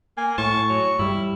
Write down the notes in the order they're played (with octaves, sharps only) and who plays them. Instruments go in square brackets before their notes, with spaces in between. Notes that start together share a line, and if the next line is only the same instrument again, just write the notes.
[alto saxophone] A#3 [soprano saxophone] G#5
[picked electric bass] A2 [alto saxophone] A5 [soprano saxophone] C#6
[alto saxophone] F#3
[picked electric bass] G2 G3 [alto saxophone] E4